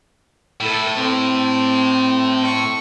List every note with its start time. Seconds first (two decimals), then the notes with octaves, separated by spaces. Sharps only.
0.61 A2 E4 A4
0.97 C4
2.45 C#6